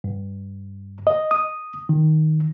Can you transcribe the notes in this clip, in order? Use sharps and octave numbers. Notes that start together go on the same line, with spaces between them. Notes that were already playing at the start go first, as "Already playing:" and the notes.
G2
D#5
D#6
D#3